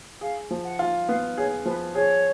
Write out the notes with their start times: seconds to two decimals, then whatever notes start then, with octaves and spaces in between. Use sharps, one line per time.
0.21 G#4 F5
0.51 F3
0.65 F#5
0.79 F4
1.07 B3 F5
1.37 G#4 C#5
1.66 F3 B4
1.94 G#4 C#5